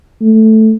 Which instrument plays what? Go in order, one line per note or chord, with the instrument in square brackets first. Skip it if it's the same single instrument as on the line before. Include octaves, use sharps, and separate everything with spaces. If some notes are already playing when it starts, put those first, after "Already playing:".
[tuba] A3